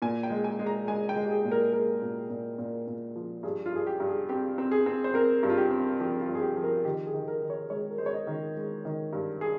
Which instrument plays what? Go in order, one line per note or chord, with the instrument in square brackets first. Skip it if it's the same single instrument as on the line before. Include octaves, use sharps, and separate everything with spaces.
[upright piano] A#2 G#5
G5
G#3
G#5
G#3
A#5
G#3 G#5
G5
G#3
G4
G#4
A#2
A#4
G#3 A#4
A#2
A#2
A#2
A#2
F3
G2 G#4
F4
G2 G#4
G4
G2
G#4
C4 G4
C4
G#4
C4
C5
C4 A#4
G2
F4
G4
C4
F3 G4
F4
G2
G#4
G4
F3
A#4
D#3 G4
G#4
D#3
A#4
D#3
C#5
G#3 C#5
A#4
G#3 C5
C#5
D#5
D#3
G#3
D#3
G2
G#4